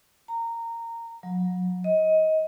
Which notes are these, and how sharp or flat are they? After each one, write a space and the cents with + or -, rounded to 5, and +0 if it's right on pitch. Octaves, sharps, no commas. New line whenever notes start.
A#5 -15
F#3 -35
D#5 +20